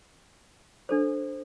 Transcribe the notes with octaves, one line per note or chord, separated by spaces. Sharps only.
D4 A4 C5